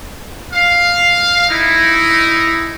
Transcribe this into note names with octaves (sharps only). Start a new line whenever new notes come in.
F5
D#4 E4